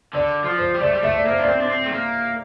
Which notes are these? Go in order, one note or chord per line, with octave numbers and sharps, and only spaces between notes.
D3 D5
F3
C5
G3
A3 D5
G3
A3 E5
D5
A#3 C5
D4
D5
C4
D4
C4
A3
A#3